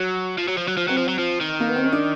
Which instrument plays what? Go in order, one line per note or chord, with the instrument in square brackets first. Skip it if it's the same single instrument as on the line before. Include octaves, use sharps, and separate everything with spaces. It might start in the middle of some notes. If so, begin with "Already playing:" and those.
Already playing: [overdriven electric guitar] F#3
F3
F#3
F3
F#3
F3
[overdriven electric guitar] F#3 [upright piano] C4
[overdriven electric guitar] F3
F#3
F3
D#3
[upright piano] A#3
B3
C4
C#4
D4